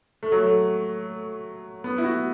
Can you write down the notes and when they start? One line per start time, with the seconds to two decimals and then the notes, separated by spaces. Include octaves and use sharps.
0.23 A3
0.32 F#3
0.42 A3
1.84 B3
1.98 E4
2.04 F#4